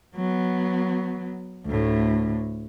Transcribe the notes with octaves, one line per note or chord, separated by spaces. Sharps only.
F#3 B3
D2 A2